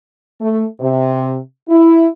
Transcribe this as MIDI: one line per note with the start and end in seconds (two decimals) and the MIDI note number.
0.40 0.65 57
0.80 1.37 48
1.69 2.06 64